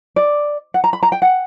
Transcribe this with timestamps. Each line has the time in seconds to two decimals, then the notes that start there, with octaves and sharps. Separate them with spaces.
0.16 D5
0.74 F#5
0.84 A#5
0.93 B5
1.03 A#5
1.12 G5
1.22 F#5